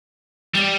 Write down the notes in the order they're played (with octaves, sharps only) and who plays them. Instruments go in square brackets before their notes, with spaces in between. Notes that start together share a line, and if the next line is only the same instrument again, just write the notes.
[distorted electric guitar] G3